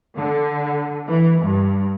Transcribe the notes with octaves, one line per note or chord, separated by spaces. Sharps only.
D3
E3
G2